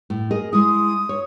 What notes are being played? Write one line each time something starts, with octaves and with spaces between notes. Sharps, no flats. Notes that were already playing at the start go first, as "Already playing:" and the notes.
A2
G#4 A#4 D#5
G#3 E4 D#6
C#5